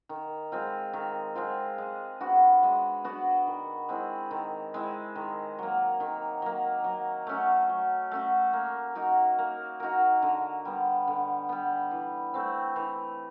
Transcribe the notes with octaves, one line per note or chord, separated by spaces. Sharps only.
D#3
G#3 C4 F4
D#3
G#3 C4 F4
G#3
B3 D4 F#4
G#3
B3 D4 F#4
D#3
G#3 C4 E4
D#3
G#3 C4 E4
D#3
F#3 A#3
D#3
F#3 A#3
F#3
A3 C#4 F#4
F#3
A3 C#4 F#4
A#3
D#4 F#4 A#4
A#3
D#4 F#4 A#4
D3
G3 B3
D3
G3 B3
E3
A3 C4
E3